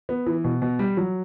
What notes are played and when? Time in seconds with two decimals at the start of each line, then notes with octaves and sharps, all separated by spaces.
0.09 B3
0.26 E3
0.44 B2
0.62 B2
0.79 G3
0.97 F#3